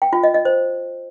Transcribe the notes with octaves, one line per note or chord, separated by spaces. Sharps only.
G5
F4
D#5
D#5
C5